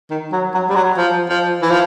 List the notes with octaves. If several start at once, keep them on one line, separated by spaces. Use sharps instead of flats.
D#3
F#3
F#3
G3
F#3
F3
F3
E3
F3